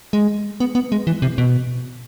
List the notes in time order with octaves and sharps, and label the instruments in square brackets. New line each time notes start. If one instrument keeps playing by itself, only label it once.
[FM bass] G#3
B3
B3
G#3
E3
C3
B2